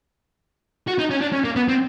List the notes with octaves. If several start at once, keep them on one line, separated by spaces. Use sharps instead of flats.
F#4
D#4
C#4
D4
C#4
A#3
B3
C4